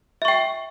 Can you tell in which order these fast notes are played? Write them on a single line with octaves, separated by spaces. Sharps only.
E5 C#6 G5